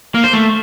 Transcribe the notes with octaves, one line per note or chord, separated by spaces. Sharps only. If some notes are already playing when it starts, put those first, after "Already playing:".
A#3
C5
A3